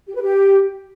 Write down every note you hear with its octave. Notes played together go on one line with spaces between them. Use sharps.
G4
B4
G4